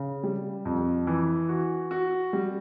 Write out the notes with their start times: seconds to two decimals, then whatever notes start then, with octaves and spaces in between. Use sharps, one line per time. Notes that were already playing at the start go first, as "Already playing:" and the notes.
Already playing: C#3
0.24 G3
0.65 F2
1.07 E3
1.49 F#4
1.91 F#4
2.33 G3